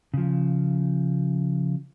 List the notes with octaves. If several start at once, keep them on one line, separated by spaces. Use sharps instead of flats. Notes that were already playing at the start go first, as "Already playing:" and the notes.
C#3 F3